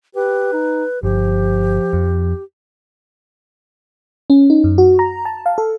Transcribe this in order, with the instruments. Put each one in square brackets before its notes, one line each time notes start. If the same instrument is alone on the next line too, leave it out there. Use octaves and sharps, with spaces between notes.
[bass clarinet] G4 [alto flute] B4
[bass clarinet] D#4
[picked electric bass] G1 [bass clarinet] F3 [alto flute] G4
[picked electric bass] F2
[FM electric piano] C#4
D#4
F#2
F#4
A#5
A5
F5
A4